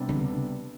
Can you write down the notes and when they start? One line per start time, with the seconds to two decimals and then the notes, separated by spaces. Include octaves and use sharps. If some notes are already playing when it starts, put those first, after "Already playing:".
Already playing: C3 G3 B3 D4
0.09 D3